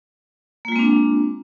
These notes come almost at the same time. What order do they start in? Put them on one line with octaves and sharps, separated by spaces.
A#3 F4 G#3 C4 D4